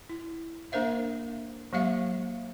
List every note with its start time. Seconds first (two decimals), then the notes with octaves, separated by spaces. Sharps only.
0.09 E4
0.72 A#3 D4 A#4 C5 E5 F5
1.73 F#3 G#3 A#3 G4 E5 F5